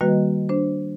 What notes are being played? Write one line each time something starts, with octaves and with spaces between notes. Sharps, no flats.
D#3 G3 A#3 F#4 B4 D#5
D4 C5